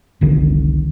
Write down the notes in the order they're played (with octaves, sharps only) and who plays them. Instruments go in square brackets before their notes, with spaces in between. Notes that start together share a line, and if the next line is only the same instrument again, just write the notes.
[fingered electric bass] F1 C2 D3 D#3